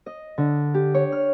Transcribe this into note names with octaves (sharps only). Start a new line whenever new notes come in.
D#5
D3
G4
C#5
F6